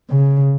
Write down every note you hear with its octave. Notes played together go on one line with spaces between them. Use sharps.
C#3